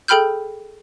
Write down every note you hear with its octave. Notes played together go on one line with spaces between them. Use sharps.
G#4 A4 G5 B5 F6 G6